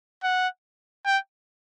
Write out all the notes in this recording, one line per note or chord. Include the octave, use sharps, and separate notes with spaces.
F#5
G5